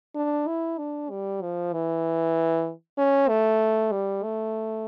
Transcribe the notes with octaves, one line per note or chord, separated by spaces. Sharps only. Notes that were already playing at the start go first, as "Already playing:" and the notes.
D4
E4
D4
G3
F3
E3
C#4
A3
G3
A3